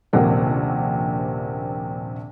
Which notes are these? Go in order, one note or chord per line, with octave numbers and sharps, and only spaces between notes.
D#1 A#1 C3 A#3 C4 F#5